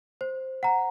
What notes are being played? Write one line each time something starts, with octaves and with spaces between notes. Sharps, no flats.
C5
F#5 A#5